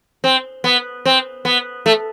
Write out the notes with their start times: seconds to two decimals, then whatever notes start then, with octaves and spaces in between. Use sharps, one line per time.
0.24 C4
0.64 B3
1.05 C4
1.45 B3
1.86 A3